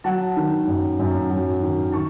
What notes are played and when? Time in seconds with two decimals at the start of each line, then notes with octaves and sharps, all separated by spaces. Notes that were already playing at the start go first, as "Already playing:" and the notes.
0.04 F#3 F#5 A5
0.37 D#3
0.67 F#2
0.99 F#2
1.30 F#3
1.62 D#3
1.92 D#3 A5 C#6